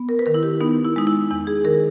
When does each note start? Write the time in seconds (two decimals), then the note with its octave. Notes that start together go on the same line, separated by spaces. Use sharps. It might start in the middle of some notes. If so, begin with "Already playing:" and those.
Already playing: B3
0.09 A#4
0.19 B4
0.26 D#3 A#4
0.34 E4
0.43 G4
0.60 B3 D#4
0.85 E4
0.96 G#3 D#4
1.07 E4
1.31 E2 E4
1.47 G#4
1.65 D#3 A#4